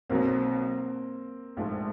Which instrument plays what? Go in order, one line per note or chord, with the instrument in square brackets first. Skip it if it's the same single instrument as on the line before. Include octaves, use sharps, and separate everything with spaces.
[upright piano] B1 B2 F#3 [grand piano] A#3 C4
[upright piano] A#1 G#2 F3 A3